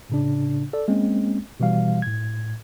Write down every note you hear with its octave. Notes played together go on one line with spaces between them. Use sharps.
A2 C#3 D4
A4 D5
G#3 A#3 C4 C#4
B2 E3 G3 F5
A2 G#6